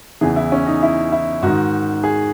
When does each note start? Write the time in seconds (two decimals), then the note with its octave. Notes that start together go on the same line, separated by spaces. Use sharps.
0.21 E2 C#3 E3 G#4
0.36 E4
0.52 C#4
0.67 D#4
0.83 E4
1.12 E4
1.42 G#2 D#3 F#4
2.04 G#4